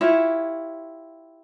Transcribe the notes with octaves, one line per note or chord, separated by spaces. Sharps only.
E4 F4 G4 C#5